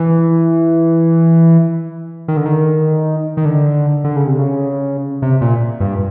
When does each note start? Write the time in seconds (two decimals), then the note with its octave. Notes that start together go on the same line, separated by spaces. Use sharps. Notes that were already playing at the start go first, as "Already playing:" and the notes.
Already playing: E3
2.28 D#3
2.37 D3
2.46 D#3
3.37 D#3
3.45 D3
4.04 D3
4.16 C#3
4.27 C3
4.39 C#3
5.22 C3
5.41 A#2
5.80 G2